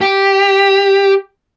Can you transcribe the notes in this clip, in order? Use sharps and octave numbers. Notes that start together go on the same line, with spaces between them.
G4